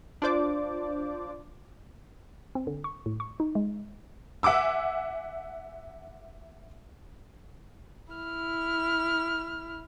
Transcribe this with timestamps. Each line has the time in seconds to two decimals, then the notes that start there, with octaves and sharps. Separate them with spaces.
0.22 D4 F4 C5 D5 D6
2.55 C4
2.67 D3
2.84 C#6
3.06 A2
3.20 C#6
3.40 D#4
3.55 G#3
4.43 E5 F#5 G#5 D6 E6
8.13 E4 F6